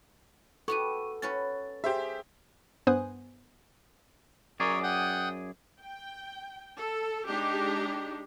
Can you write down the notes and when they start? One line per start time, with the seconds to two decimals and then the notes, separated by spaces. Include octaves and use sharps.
0.68 B3 F#4 G4 A4 C#6 D#7
1.22 C#4 F#4 B4 A6
1.84 G4 G#4 C5 E5
2.87 G2 B3 C5 G#5 D#6 F#6
4.60 F#2 G#4 A#4 C#5 D5
4.83 F#5 G5 D#6
5.83 G5
6.78 A4
7.27 G#3 D4 D#4 G4